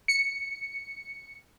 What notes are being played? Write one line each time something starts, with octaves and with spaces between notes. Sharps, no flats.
C#7